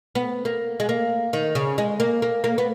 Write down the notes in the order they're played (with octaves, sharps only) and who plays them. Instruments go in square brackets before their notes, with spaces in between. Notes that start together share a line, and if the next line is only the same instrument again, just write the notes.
[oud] B3
A#3
G#3
A#3
D#3
C#3
G#3
A#3
A#3
A#3
B3